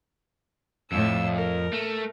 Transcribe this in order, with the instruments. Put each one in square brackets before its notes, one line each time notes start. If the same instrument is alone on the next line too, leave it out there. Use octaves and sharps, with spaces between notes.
[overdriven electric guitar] F2 [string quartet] A2 E6
[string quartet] A#4
[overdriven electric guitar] A3